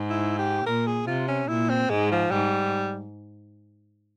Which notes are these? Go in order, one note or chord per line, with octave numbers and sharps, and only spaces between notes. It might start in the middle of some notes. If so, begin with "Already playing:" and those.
Already playing: G#2
E4
G4
A#2 A#4
G#4
C3 F4
C#4
A#2 E4
C4
G#2 G#3
F3
G#2 G3